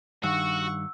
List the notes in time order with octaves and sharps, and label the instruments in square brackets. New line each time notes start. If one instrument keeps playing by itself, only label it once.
[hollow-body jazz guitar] G2 D#3 [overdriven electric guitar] F#4 [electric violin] F#5 C#6 [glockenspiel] E6